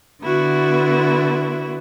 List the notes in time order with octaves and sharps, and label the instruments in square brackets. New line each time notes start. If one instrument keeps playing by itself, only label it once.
[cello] D3 B3 [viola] E4 F#4